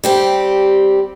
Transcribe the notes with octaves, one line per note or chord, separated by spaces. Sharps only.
G3 C4 G4